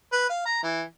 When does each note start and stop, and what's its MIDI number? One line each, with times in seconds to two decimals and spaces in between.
0.12 0.29 71
0.30 0.42 77
0.46 0.60 82
0.63 0.83 52